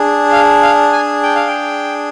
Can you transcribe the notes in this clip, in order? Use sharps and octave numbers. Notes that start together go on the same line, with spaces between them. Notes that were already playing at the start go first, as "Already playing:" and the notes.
Already playing: D4 G#4
F5
F5
G#5
G5
F5
G5